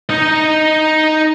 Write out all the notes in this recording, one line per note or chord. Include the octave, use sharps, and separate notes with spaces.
D#4 D#5